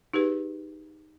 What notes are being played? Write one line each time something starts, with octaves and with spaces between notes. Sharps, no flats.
D#4 G4 G#4 B4